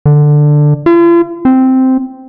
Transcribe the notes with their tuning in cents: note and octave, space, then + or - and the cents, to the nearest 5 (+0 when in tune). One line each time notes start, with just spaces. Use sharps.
D3 +10
F4 -45
C4 -5